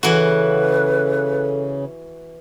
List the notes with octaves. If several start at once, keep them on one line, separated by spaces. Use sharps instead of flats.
C#3 E3 F#4 A4 B4